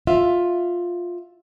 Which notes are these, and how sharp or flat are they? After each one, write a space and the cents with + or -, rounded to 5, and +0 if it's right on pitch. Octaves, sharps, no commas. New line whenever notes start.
F4 +10 E5 +5